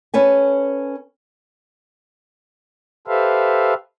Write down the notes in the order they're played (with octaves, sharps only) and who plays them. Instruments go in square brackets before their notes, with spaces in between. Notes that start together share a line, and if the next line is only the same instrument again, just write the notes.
[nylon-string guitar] C#4 A4 B4 G#5
[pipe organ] G4 A4 B4 C5 E5 F5